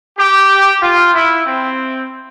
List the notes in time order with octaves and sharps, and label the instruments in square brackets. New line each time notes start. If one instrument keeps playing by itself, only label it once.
[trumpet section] G4
F4
E4
C4